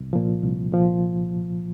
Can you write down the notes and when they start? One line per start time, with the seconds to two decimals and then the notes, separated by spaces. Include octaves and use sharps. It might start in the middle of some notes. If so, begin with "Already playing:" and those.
Already playing: C2
0.13 A#2 F3
0.43 C2
0.72 A#2 F3